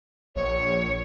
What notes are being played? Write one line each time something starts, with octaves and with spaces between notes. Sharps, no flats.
A#1 C#5